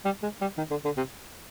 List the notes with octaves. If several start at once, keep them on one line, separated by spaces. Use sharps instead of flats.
G3
G#3
G3
D#3
D3
D3
C3